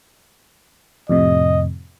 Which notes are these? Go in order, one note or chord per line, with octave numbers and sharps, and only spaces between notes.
F2 A2 C3 D#5